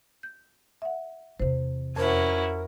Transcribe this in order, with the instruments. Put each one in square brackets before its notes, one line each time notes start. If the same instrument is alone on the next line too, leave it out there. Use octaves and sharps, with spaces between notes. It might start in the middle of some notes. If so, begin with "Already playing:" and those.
[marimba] G6
E5 F#5
[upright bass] E2 C3 [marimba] C5
[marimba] F2 C5 [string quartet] C#4 E4 F#4 [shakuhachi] A#4